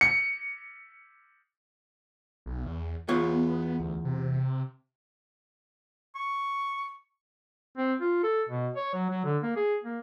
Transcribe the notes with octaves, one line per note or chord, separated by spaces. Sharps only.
C#7
B1
E2
E2 B3 F4 C#5
D2
C3
C#6
C4
F4
A4
B2
C#5
F#3
F#3
D3
A#3
G#4
A#3